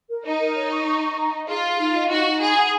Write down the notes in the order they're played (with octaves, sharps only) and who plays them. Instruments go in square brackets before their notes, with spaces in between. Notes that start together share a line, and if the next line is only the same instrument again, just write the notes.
[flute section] A#4
[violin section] D#4 [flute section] D#5
[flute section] A#4
C#5
C#6
C#6
C#6
A#5
D#5
[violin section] F4 [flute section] G#4
[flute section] G#4
D#4
D#5
[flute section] D#4 [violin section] F#4
[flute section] D#4
[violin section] G#4 [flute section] B5
[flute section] F#5